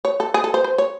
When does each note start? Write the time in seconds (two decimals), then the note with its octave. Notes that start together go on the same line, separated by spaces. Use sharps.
0.05 C#5
0.20 A4
0.34 G#4
0.44 A4
0.54 C5
0.64 C5
0.78 C#5